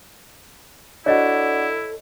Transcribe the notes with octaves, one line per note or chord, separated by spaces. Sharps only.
D4 E4 F#4 A4 C#5 D#5